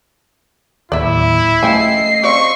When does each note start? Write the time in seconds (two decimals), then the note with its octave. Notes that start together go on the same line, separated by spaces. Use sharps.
0.92 D1 D#2 E4 D5 E5
1.63 F3 A3 C#4 D#5 G5 G#5 C7
2.24 F3 C4 D5 C#6